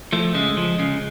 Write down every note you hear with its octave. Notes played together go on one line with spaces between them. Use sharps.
F3 A3
C#3 G#3
F3
C#3